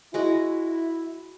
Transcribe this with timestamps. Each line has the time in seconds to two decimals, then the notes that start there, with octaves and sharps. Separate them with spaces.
0.14 G#3 E4 F#4 D#5